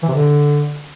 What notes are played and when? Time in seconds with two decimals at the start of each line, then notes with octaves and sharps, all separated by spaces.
0.03 E3
0.08 C3
0.13 D3